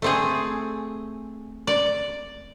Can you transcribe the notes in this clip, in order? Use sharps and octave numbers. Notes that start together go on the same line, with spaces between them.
A3 C4 G#4
D5